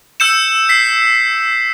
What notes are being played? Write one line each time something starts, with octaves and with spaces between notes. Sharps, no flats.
E6 G6 C#7 E7
B6 C7